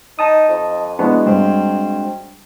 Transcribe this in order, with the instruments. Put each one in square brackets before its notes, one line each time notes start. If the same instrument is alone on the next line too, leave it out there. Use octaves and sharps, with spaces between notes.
[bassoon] D#4 [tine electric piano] D#5 A5 D#6
[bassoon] F2
[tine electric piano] G#3 D4 F#4 [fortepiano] B3 E4
[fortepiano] G2 [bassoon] C4